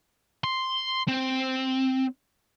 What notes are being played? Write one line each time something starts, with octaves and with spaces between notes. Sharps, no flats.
C6
C4